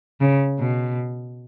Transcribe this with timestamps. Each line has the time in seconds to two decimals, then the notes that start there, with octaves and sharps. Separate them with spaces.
0.21 C#3
0.60 B2